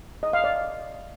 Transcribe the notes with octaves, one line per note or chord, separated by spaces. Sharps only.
D#5
F5
D5